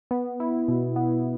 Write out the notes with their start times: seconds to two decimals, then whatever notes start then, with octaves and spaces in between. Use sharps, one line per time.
0.11 B3
0.40 E4
0.68 B2
0.96 B3